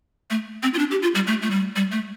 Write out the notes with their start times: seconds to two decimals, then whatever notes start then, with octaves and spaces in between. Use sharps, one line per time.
0.30 A3
0.63 C4
0.74 F4
0.79 D4
0.91 G4
1.02 F4
1.15 G3
1.27 A3
1.42 A3
1.51 G3
1.76 G3
1.92 A3